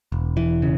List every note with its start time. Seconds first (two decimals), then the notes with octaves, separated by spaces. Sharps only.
0.12 E1
0.37 E3
0.62 C#3